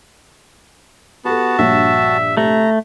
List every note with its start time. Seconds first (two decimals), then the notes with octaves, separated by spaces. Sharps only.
1.25 B3 F#4 G4 A4 A5
1.59 A#1 G2 C#5 E5
2.37 C3 A3 A#5